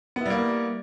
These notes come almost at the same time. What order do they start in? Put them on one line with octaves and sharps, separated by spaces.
B3 E4 G3 A#3